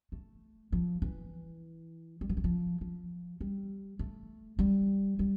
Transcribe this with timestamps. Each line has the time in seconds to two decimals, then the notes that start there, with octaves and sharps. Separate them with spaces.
0.12 A3
0.72 F3
1.02 E3
2.21 G3
2.29 F3
2.37 E3
2.44 F3
2.81 F3
3.41 G3
3.99 A3
4.59 G3
5.19 G3